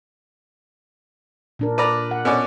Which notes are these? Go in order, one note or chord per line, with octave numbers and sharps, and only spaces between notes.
A#2 D4 A#4
B4 D5 A#5
F#5
B2 C#4 D5